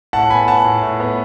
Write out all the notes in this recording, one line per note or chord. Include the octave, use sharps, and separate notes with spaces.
A2 F#5 A5
B3 G#5 B5
B3 F#5 A5
A2
A2
B3